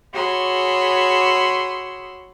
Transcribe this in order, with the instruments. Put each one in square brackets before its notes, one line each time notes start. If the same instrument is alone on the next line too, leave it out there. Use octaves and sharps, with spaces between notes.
[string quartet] F#4 G#4 C#5 B5 C6 E6